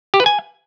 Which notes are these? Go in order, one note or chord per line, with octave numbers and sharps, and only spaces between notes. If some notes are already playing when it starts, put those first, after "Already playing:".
G4
B4
G#5